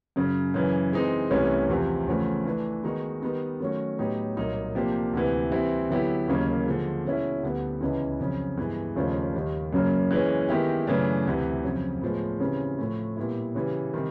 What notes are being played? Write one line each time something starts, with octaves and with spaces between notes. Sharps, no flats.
F#2 C#3 F#3
F#2 C#3 E3
E3 G#3 C4 D#4
C2 C3 E3 A3 C#4
E2 C3 F3
E2 C#3 F3 A3
E3 A3 D4
D#3 G#3 B3 D#4 F#4
D#3 G3 B3 D#4
D#3 F#3 A3 C#4 F#4
A2 F#3 B3 D#4 G4
C2 A#2 F#3 A#3 D#4
C3 F3 A#3 D4 G4
D2 C3 E3
E3 G3 C4 E4
D3 F#3 B3 E4 G4
D#2 C#3 F#3 A#3
D3 F3 G#3
B2 G#3 C#4 E4
D2 D3 G3 B3
C#2 C#3 E3
F2 C#3 F#3
G2 E3 G#3 B3
D#2 C#3 F3 A3 D4
D#2 D#3 G3
F#2 C#3 F#3 A#3
E3 G#3 C#4
D#3 G#3 B3 E4 G4
F#2 C#3 E3 A3 D4
D2 C3 E3
F2 C#3 F#3
A2 F3 G#3 B3
C#3 E3 G3 C4
A2 F3 A3
A#2 G3 B3 E4
C#3 E3 G3
C3 D#3 G3